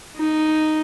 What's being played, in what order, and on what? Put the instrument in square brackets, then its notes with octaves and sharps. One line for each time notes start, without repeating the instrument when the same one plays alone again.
[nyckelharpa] D#4